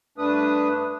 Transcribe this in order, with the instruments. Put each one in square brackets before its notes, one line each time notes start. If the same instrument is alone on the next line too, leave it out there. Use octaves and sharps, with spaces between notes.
[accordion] G2 A3 D4 B4 D#6